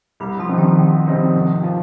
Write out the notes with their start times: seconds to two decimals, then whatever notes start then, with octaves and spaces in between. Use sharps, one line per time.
0.20 C2 G3
0.39 F3
0.48 C3 G3 C4 D#4
0.58 D#3
0.77 C2
1.06 C3 G3 C4 D#4
1.35 G#1
1.63 F3